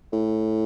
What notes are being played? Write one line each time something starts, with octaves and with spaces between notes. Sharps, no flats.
A2